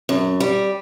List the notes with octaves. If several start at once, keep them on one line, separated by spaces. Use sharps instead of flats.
F#2
G3